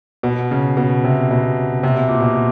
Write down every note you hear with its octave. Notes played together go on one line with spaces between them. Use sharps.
B2
C#3
B2
C3
B2
C3
B2
A#2
B2